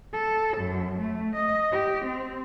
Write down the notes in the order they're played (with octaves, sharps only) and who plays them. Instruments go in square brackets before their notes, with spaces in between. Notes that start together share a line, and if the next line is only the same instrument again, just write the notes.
[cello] A4
F#2
A3
D#5
G4
C4